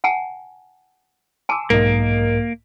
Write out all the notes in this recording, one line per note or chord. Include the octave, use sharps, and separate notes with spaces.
F#5 G#5 A5
G#5 A5 C6 D6 E6
B1 G#2 A#3 A#4 D#5